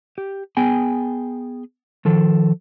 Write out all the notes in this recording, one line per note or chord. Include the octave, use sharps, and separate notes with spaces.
G4
B3 G#4 G5 G#5
D#3 F3 A4